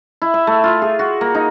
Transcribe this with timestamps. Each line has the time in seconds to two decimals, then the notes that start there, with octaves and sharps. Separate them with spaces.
0.22 E4
0.34 E5
0.47 A3
0.64 F4
0.82 G#4
0.99 F#4
1.21 A#3
1.35 D#4